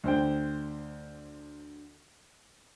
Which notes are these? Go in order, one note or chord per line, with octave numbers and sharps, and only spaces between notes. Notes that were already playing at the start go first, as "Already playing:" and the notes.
D2 C5 G5